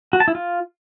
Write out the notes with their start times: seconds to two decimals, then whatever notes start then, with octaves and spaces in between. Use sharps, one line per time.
0.13 F#4
0.20 A5
0.28 E4
0.35 F4